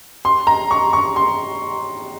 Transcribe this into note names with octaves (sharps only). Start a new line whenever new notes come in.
C6
A#5
C#6
C#6
C6